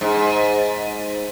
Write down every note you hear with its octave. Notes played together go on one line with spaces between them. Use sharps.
G#2